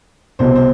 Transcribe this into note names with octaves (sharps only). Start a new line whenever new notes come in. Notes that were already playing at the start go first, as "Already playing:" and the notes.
C2 B2 C5
C5